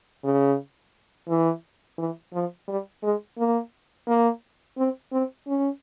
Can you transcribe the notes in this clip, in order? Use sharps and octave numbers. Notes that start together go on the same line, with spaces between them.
C#3
E3
E3
F3
G3
G#3
A#3
A#3
C4
C4
C#4